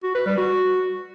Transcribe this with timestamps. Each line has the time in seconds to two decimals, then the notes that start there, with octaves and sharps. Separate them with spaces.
0.03 F#4
0.15 B4
0.26 G3
0.37 F#4